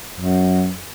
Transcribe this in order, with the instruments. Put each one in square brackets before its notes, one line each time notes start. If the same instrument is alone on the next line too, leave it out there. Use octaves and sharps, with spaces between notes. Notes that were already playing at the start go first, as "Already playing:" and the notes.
[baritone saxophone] F#2